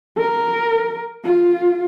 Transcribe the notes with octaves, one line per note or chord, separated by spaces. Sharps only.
A#4
F4